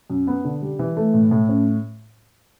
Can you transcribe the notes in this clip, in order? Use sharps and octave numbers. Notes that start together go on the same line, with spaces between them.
F#2
B3
D3
G3
E3
A3
A2
A2
C#4